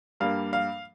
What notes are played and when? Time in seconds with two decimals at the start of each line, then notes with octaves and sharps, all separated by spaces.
0.20 G2 G3 A#3 F5
0.53 F5